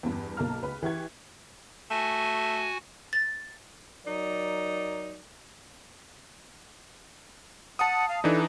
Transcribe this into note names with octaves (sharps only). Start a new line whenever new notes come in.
E2 G2
B1 A#3 A5 A#5 F6
C#2 B4 B5
E3 G4 C#6 G#6
A3 F#4 G#5
A6
F#3 D#4 A#4 D5
F#5 A5 D#6
F5
E3 D4 D#4 A4